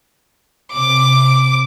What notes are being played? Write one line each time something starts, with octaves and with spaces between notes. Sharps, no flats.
C3 D6